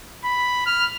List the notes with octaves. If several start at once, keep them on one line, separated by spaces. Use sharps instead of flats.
B5
F6